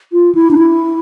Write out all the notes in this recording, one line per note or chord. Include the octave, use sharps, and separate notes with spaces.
F4
E4
D4
E4